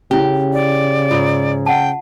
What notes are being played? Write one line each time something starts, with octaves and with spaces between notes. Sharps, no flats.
C#3 C#4 E4 G4
D5
G#2 F4
F#5 G5 A5